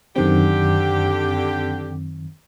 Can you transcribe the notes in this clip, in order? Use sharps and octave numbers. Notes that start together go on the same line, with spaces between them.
F#2 D3 D#3 C4 G4